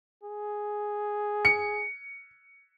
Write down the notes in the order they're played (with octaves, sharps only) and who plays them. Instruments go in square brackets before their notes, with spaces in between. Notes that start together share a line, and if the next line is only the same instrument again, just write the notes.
[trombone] G#4
[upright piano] C#7